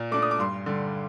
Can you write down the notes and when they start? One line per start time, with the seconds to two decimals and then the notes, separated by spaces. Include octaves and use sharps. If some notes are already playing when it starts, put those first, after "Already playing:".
Already playing: A#2
0.12 A3 D4 D6
0.22 D#6
0.31 D6
0.39 G2 C6
0.66 D3 G3